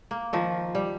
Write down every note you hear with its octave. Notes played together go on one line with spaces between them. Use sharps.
A#3
D#3 F3
G3